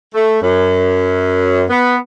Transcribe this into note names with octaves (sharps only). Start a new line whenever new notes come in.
A3
F#2
B3